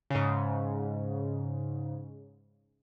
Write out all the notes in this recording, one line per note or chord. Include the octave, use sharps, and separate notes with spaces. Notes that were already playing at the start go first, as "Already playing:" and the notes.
G#2 C#3